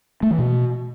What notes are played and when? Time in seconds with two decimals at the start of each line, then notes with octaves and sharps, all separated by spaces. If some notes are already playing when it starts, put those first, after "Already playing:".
0.23 A3
0.31 E3
0.39 B2